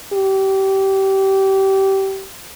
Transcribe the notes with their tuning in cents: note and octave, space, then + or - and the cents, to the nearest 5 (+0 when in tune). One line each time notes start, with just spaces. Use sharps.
G4 -25